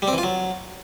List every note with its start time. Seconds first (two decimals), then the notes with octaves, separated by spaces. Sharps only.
0.02 G3
0.08 C4
0.13 E3
0.18 F4
0.23 F#3